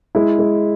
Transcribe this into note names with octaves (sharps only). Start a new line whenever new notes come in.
G#3 E4
G#3